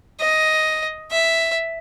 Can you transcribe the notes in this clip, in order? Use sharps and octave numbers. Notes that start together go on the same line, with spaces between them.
D#5
E5